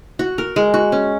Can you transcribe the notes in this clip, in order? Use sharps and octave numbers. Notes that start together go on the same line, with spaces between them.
F#4
A#4
G#3
F#4
C#4